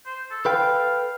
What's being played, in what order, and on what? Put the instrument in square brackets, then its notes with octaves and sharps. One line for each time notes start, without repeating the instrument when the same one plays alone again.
[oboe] C5
A4
[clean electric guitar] A4 B4 G5 [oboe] F5